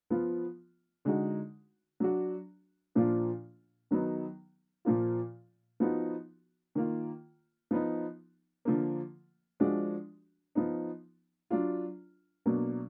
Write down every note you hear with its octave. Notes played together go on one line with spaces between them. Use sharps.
F3 B3 F4
D3 G#3 D#4 F#4
F#3 D4 F#4
A#2 F3 A#3 D4 F4
D#3 F#3 B3 D#4
A#2 F3 A#3 F4
F3 B3 D#4 F#4
D#3 A#3 F4
F3 B3 D#4
D3 F3 A#3
F3 G#3 D4 F#4
F3 B3 D#4
F#3 D4 F4
B2 F#3 A#3 D4